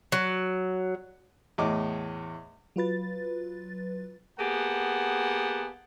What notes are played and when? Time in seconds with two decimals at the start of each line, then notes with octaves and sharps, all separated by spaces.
0.12 F#3
1.58 E2 A2 D#5 D6
2.76 F#3 F4 B4 A6
4.39 A#3 B3 G4 G#4 F#5 A5